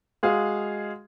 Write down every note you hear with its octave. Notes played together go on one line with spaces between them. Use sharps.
G#3 F#4 G#4 F5